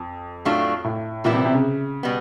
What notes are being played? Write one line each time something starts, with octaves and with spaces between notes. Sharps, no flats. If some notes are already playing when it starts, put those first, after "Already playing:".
Already playing: F2
A2 F#3 A3 D4 F4
A2
A#2 E3 G3 B3 E4
C3
C3
C#3
B2 G3 B3